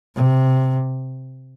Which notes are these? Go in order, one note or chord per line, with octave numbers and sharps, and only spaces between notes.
C3